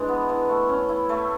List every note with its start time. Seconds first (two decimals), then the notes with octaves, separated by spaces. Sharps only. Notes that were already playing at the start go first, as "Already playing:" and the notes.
Already playing: E3 G#3 D4
0.08 B3
0.29 E3
0.49 A3
0.69 C#4
0.89 E4
1.09 A3